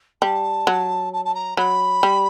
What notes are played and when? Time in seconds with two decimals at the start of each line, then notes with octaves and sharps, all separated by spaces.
0.22 G3 A5
0.67 F#3
1.13 A5
1.25 A5
1.34 A#5
1.57 F#3 B5
2.03 G3